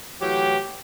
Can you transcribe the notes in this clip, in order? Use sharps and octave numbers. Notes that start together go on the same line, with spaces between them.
A2 E3 F#3 G4